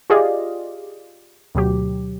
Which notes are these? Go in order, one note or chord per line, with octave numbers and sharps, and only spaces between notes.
F4 G4 G#4 D5 D#5 F5
D2 B2 F#3 G4